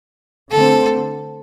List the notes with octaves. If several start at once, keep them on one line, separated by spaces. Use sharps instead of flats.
D3 A3 C4 A4